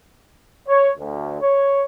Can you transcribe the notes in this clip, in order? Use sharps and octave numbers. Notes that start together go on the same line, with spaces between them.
C#5
D2
C#5